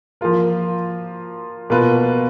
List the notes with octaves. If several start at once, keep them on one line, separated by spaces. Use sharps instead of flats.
F3 A#3 F4 A#4
B2 A#3 F4 B4